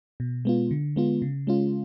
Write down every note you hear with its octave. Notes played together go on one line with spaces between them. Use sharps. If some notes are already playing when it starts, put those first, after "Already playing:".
B2
G#3 B3 F4
D3
G#3 B3 F4
C#3
G#3 C#4 F4